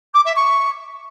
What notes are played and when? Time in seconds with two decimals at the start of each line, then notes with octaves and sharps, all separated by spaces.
0.14 D6
0.25 E5
0.36 C#6